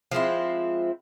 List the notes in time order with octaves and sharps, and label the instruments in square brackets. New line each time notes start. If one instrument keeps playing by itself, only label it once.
[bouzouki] F3 G#3 C4 E4